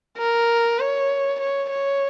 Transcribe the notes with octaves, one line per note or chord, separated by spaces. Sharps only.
A#4
C#5
C#5
C#5